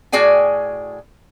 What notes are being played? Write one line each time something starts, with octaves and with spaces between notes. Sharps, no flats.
A2 F#4 G#4 D5 G5 G#5